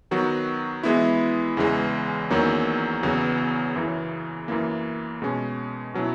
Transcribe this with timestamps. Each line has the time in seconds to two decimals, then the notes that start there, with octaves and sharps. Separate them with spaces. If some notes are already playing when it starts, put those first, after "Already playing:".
0.11 D#3 F#3 B3 F#4
0.83 E3 G#3 B3 E4
1.57 E2 C#3 E3 G#3
2.30 E2 D#3 F#3 A#3 C#4
3.03 E2 C#3 F#3 B3
3.76 F#2 C#3 E3
4.48 F#2 E3 A#3
5.22 B2 G#3 C#4
5.94 B2 F#3 C#4 E4